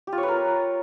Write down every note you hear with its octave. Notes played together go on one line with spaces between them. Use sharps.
G4
F4
C#5
B4
A#4